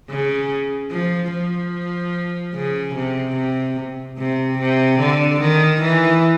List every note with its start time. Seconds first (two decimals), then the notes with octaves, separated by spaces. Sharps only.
0.10 C#3
0.91 F3
1.32 F3
2.54 C#3
2.95 C3
3.36 C3
4.18 C3
4.59 C3
5.00 D3
5.41 D#3
5.82 E3